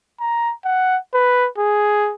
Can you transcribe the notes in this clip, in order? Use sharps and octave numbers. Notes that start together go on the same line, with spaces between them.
A#5
F#5
B4
G#4